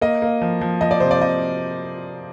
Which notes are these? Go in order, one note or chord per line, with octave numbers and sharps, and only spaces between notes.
A#3 D#5
A#3
F3
F3
F3 D#5
D5
C3 C5
D5
C3 D#5